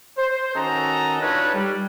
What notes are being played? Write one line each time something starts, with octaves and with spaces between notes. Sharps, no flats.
C5
D#3 C#4 F#4 A4 D#5 A#5
D4 D#4 F4 A4 B4 C#5
G3